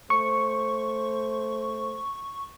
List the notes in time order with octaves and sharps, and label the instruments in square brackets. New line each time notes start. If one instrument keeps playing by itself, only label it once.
[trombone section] A3 C5 [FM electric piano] C#6